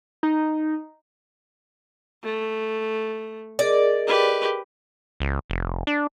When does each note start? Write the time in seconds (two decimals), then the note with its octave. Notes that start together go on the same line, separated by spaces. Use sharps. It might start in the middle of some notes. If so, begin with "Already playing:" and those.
0.23 D#4
2.23 A3
3.59 G#4 A#4 D5 D#5
4.07 G4 B4
5.20 C#2
5.50 F1
5.87 D4